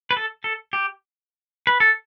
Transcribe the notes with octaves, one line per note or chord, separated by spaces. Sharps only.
B4
A4
A4
G4
B4
A4